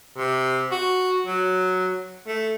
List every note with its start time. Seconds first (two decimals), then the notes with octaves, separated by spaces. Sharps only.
0.18 C3
0.71 F#4
1.26 F#3
2.27 A3